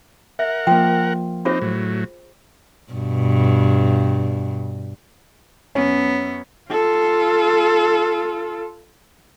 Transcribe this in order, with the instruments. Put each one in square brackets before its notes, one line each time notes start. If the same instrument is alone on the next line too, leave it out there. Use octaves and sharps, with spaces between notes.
[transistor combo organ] A#4 F#5 [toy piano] E5
[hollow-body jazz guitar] F3 A#3 [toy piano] G5
[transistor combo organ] C4 D#4 [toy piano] F4 G#4 C5
[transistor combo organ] A2 F#3
[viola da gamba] G2 B2
[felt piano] F#2 C#4 [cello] B3
[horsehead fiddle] F4 A4